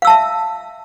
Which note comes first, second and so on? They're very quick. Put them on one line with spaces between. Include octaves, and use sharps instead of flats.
F5 E6 A5 E5